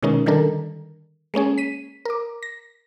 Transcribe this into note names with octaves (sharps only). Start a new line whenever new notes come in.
B2 D#3 G#3 C#4 D#4 A#4
D3 D#3 G3 D4 A4 A#4
G#3 A#3 C#4 G#4
B6 D#7
A#4 D6
A#6